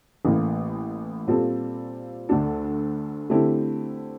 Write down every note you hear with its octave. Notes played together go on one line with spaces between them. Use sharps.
A1 A2 E3 A#3
A#2 G3 C4 F4 A4
D2 D3 A3 D4 A4
D3 A3 C4 E4 G4